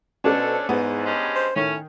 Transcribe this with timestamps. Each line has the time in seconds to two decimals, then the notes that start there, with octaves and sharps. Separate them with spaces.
0.24 B2 A3 C#4 D4 A4 C5
0.69 E2 G#2 B3 C5
1.06 G2 G#3 C#4
1.35 C5
1.56 A2 D#3 C#4